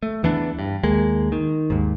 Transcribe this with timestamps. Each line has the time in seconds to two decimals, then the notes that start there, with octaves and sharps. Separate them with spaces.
0.03 A3
0.23 E2 E3 B3 D4
0.59 G2
0.83 D#2 G#3 A#3
1.32 D#3
1.70 D#2 G#2